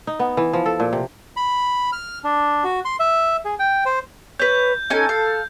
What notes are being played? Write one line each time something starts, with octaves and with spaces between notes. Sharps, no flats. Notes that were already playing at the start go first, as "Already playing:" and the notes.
D#4
B3
E3
F3
A4
A#2
C3
B5
F6
D4
F#4
C6
E5
G#4
G5
C5
B4 C#5 G6
C#4 D#4 A4 G#5
F5